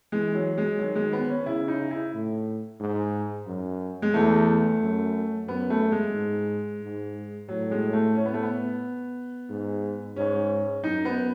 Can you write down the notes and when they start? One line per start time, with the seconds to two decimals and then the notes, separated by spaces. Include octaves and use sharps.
0.12 E3 G#3
0.35 F#3
0.58 G#3
0.79 D#3 F#3
0.96 G#3
1.13 B3
1.29 C#4
1.46 C#3 E4
1.68 D#4
1.91 E4
2.14 A2
2.80 G#2
3.47 F#2
4.02 G#3
4.14 E2 A3
4.81 F#2
5.47 F#2 B3
5.70 A3
5.92 G#3
6.14 G#2
6.82 G#2
7.48 A2 F#3
7.71 G#3
7.93 A3
8.15 C#4
8.25 B3
8.34 A3
8.43 B3
9.49 G#2
10.16 G#2 C#4
10.84 F#2 D#4
11.05 B3